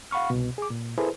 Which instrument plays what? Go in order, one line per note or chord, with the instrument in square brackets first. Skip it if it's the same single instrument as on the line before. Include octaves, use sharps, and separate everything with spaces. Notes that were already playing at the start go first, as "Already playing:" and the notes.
[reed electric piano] F5 F#5 B5 C#6 F6
C2 B2
G#4 D6
A#2
E4 G#4 A4 B4 C5